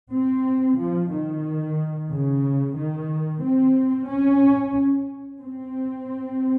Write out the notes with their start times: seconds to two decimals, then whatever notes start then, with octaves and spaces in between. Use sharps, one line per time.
0.12 C4
0.78 F3
1.11 D#3
2.11 C#3
2.76 D#3
3.42 C4
4.09 C#4
5.41 C4